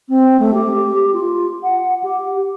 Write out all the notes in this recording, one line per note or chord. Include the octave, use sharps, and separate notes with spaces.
C4
A3
G4
F4
F#5
G4